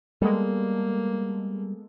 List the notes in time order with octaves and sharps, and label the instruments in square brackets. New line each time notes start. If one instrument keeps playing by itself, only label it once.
[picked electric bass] G3 [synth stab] G#3 B3 A4 [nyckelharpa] A#3